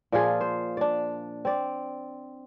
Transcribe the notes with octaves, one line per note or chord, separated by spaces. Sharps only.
A#2 F3 F4 G#4
C5
D4 D5
C4 D5